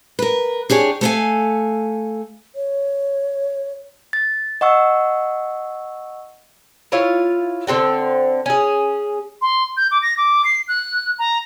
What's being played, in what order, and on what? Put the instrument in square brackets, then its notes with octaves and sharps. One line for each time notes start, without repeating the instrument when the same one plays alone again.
[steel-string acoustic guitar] A#4 B4
D4 G4 G#4 C#5
A3 A4 A#4 C#5 F5 G#5
[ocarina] C#5
[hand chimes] A6
D#5 F#5 C#6 E6
[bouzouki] E4 F4 C#5
D3 C4 F#4 G5
C#4 G#4
[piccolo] C6
G6
D6
A#6
D6
C7
F#6
A#5